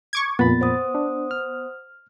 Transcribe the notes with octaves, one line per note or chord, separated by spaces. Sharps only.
C#6 D6 G#6
F2 A#2 B3 B5 A6
C5 F#5 D#6
D4
F6